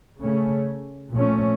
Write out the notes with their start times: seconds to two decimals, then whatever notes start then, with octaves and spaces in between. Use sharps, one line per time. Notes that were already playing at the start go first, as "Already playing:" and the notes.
0.20 C#3 A3 C#4
1.12 A#2 F3 A3 C#4